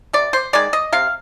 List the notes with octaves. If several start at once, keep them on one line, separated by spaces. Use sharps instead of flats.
C3 D5
C5
D#3 G#3 D5
D#5
C3 F5